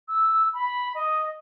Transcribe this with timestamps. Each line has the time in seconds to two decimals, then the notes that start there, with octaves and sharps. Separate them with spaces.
0.08 E6
0.54 B5
0.95 D#5